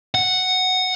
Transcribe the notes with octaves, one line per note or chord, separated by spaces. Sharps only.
F#5